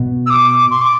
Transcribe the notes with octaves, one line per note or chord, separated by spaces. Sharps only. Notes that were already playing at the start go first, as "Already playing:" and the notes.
Already playing: B2
E6
D6
C6
D6